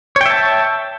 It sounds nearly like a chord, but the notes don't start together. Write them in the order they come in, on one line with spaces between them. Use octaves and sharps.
C#5 G5 E5 A5